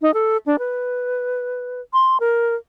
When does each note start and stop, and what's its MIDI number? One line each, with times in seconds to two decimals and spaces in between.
0.02 0.11 63
0.14 0.37 69
0.46 0.56 62
0.59 1.81 71
1.93 2.20 84
2.20 2.55 70